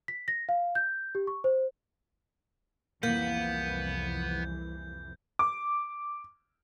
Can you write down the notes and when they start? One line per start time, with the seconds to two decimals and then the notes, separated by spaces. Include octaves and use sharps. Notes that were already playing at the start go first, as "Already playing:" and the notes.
0.08 B6
0.28 A#6
0.49 F5
0.75 G6
1.15 G4
1.27 C#6
1.44 C5
3.03 C2 F2 E3 A#3 B3 G6
5.39 D6